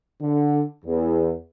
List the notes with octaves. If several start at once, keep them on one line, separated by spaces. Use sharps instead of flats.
D3
E2